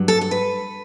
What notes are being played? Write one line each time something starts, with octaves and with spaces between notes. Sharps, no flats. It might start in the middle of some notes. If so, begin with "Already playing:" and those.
Already playing: G2 F#3
A4
A4
B4